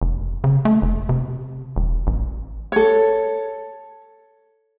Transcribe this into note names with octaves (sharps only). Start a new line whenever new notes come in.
F1
C#3
A3
F1
C3
E1
A1
A4 C#5